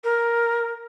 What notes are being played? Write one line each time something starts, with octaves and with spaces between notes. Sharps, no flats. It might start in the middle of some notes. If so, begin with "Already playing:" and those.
A#4